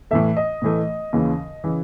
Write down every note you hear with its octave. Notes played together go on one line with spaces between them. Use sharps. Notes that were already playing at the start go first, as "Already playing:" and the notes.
A2 E3 A3 E5
D#5
A2 E3 A3
D#2 C#3 E3
C#3 E3